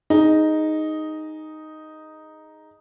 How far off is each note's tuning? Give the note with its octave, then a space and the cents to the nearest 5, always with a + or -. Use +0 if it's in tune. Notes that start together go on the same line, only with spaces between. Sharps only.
D#4 +0 G#4 +0